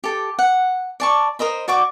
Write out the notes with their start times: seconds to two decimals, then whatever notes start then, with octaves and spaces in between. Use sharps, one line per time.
0.04 G4 A4
0.39 F#5
1.00 D5 A5 C#6
1.39 A#4 C5 D#5 B5
1.68 F#4 D5 C#6 D6